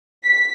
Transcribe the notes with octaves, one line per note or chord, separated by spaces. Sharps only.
B6